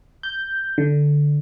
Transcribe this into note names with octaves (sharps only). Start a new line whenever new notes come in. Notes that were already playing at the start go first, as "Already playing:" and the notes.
G6
D3